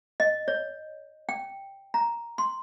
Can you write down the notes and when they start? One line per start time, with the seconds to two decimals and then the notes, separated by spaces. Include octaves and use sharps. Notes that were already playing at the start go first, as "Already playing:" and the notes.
0.20 D#5
0.48 C#5
1.29 G5
1.94 A#5
2.38 C6